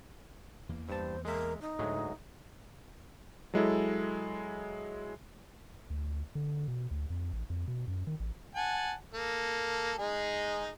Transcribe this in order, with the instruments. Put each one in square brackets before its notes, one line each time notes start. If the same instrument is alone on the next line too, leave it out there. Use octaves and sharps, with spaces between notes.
[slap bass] E2 E3 A#3
[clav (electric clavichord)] G2 A5 [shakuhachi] C5
[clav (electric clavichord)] G#3 E5 [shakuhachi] A#4
[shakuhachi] D#4
[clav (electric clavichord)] D2 F#3 G#3 [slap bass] A2
[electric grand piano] F#3 G#3 E4 A4
[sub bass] D2
D3
B2
D2
F2
A1
F2
B2
F#2
D#3
A1
[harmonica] F#5 G#5 A5
A#3 A4
G#3 D#4 G#4